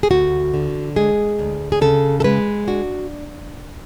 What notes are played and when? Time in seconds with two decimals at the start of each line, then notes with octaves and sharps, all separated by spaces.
0.03 G#4
0.11 D2 F#4
0.54 D3
0.96 G#3 G#4
1.39 D2
1.72 G#4
1.81 C#3 A4
2.20 A4
2.24 G#3 B4
2.67 D4 F#4